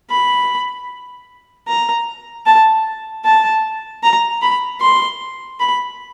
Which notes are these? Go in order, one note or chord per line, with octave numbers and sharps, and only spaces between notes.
B5
A#5
A5
A5
A#5
B5
C6
B5